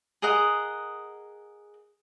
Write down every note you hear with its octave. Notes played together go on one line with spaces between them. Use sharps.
G#4 A#4 D#5 F#5